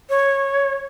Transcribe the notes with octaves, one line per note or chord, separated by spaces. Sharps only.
C#5